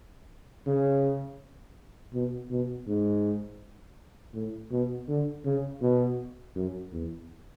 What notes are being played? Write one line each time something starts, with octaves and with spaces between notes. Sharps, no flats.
C#3
B2
B2
G#2
A2
B2
D3
C#3
B2
F#2
E2